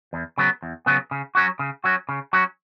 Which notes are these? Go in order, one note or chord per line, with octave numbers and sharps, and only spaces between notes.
E2
C#3 F#3 B3
E2
C#3 F#3 B3
C#3
F#3 C#4 F#4
C#3
F#3 C#4 F#4
C#3
F#3 C#4 F#4